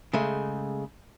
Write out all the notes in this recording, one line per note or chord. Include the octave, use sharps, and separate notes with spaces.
C#3 G#3 A3